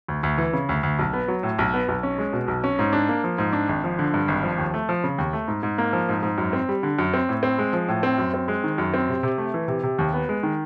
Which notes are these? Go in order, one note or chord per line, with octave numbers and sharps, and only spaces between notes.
D2
D2
E3
C#3
D2
D2
B1
B3
F#3
A2
B1
B3
B1
C#4
G#3
B2
B1
C#4
G#2
D4
A#3
F3
G#2
D4
G#1
F3
D3
G2
G#1
F3
D#2
A3
F3
C#3
D#2
A3
G#2
G#2
A#3
F3
G#2
G#2
F#2
C4
G3
D3
F#2
C4
A2
C4
G#3
F3
A2
C4
F#2
C4
G#3
D#3
F#2
C4
C3
C3
A3
E3
C3
C3
D#2
B3
G#3
D#3